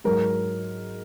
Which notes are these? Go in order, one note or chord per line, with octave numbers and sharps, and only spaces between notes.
G#2 F#3 A#4